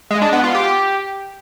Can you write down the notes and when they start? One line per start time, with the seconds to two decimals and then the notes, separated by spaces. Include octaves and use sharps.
0.11 G#3
0.22 D4
0.33 B3
0.44 F4
0.55 G4